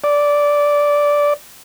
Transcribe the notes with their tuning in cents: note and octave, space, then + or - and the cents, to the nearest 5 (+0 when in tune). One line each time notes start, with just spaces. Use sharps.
D5 -10